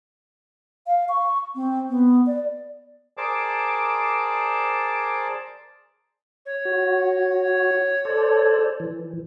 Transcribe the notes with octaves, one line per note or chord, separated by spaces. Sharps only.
F5
C#6
C4
B3
D5
G#4 A#4 C5 D5 A5 D6
C#5
F#4
A4 C5 D5
E3